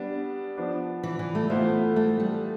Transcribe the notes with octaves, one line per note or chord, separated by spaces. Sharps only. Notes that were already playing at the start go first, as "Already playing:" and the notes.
Already playing: G3 B3 D4
F3 B3 D4
E3
E3
A3
E3 A3 B3 F4 C5
A3
G3